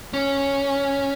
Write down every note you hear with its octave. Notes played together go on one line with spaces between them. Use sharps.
C#4